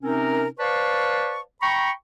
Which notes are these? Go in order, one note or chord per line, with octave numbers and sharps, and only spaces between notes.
C3 C4 C#4 D#4 A#4
B4 C5 D5 F5 A5 C#6
G5 A#5 B5 C#6